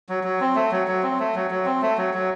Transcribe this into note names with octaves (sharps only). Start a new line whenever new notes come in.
F#3
F#3
C4
A3
F#3
F#3
C4
A3
F#3
F#3
C4
A3
F#3
F#3